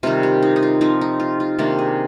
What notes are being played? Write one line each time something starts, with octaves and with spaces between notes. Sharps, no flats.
C3 D#3 G3 F4
G4
D#4
D#4
F4
F3 C4 D#4
D#4
F4
F4
C3 D#3 A#3 D4 G4
G#4